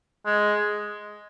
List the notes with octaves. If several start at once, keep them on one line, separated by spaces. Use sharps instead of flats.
G#3